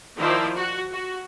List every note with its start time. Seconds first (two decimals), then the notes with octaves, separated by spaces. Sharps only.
0.17 D#3 F3 E4 C5 D5
0.54 F#4
0.92 F#4